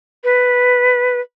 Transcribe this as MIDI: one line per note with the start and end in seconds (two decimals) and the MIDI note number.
0.24 1.21 71